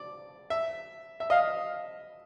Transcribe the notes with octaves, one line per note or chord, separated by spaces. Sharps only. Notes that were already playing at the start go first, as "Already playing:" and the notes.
Already playing: D5
E5
E5
D#5 F5